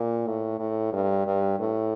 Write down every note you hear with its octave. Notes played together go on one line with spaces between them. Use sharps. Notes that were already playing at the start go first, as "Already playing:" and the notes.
Already playing: A#2
A2
A2
G2
G2
A2